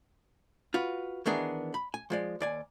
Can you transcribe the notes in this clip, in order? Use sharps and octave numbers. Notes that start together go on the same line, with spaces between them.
F4 F#4 B4
D#3 E3 B3 D4 G#4 A#4
B5
G#5
F3 G#3 D5
D#2 D5 G#5